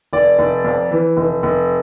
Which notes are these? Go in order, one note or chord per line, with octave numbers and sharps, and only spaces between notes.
F1 D5
F1
F2
E3
F1
F1